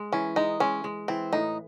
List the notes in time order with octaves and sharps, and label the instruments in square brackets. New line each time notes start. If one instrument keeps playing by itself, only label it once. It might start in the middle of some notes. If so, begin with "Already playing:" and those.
Already playing: [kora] G#3
[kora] E3 [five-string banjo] C#4
[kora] G#3 [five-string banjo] D#4
[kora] G#3 [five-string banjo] C#4
[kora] G#3
[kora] E3 [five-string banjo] C4
[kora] A2 [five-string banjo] D#4